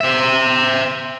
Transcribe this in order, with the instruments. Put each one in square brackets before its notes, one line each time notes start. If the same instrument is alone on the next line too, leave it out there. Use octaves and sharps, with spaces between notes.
[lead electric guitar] C5 E5